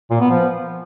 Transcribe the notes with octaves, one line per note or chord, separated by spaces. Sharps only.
A#2
B3
F3